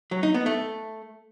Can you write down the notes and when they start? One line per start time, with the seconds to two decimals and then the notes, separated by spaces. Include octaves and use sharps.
0.11 F#3
0.23 D#4
0.34 B3
0.46 A3